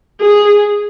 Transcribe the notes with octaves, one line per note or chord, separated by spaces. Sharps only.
G#4